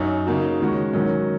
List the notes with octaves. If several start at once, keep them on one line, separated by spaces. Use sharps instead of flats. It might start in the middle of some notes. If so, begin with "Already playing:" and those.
Already playing: F#2 F#3 D#4 F#4
C#3 A#3 D#4 F#4
D#3 G#3 C#4 F#4
G#2 D#3 F#3 C#4